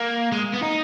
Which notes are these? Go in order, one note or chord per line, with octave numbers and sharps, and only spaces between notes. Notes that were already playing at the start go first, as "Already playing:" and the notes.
Already playing: A#3
G#3
B3
D#4